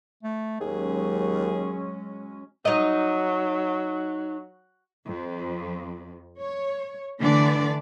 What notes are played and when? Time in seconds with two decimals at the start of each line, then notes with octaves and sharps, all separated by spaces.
0.23 A3
0.60 D#2 F#3 G#3 C#4 G#4
2.65 F#3 D#4 D#5
5.05 F2
6.40 C#5
7.20 D3 E3 A3 D4 D5